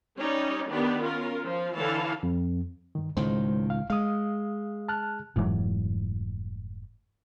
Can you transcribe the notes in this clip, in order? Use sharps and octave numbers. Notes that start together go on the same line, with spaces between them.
G3 C#4 D#4 C#5 D5
D#3 B3 D4 G4 B4
C#4 F4 A#4
F3 F5
D3 E3 C#5 F5 A5
F2
G2 D#3
C#2 A2 D#3 G#3 C5
F5
G#3 F5 D#6
A5 F6 F#6
F1 G#2 E3 F#3